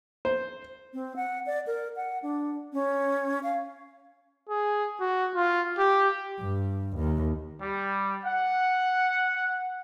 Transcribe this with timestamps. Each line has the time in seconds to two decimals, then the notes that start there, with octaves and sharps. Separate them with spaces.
0.25 C5
0.93 C4
1.16 F#5
1.46 D5
1.67 A#4
1.96 F#5
2.23 D4
2.73 C#4
3.43 F5
4.49 G#4
5.01 F#4
5.35 F4
5.79 G4
6.40 G2
6.96 D#2
7.61 G3
8.24 F#5